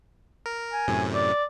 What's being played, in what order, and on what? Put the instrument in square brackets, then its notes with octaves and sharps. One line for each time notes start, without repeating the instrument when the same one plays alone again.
[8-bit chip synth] A#4
[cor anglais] G#5
[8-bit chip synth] F#2 A2 C3
[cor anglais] D5